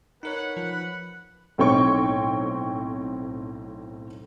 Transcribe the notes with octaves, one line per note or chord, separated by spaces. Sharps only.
D#4 A#4 B4 C#5 F#5
F3 F#5
B1 A2 C4 C#5 G5 C#6